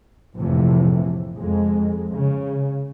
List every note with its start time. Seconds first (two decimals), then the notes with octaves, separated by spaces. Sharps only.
0.37 F1 A#1 A2 C3 E3 F3
1.34 F2 G#3
2.12 C#3